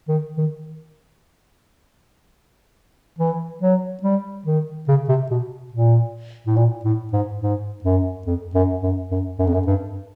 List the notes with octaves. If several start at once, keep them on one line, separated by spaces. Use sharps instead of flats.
D#3
D#3
E3
F#3
G3
D#3
C#3
C3
B2
A#2
A2
A#2
A2
G#2
G#2
F#2
F2
F#2
F#2
F#2
F#2
F2
F#2
G2